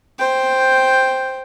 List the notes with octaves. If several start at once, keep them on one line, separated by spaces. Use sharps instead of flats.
C5 G5